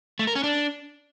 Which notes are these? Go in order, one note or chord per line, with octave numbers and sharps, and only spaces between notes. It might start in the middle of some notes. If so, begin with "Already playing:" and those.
A3
A#4
C#4
D4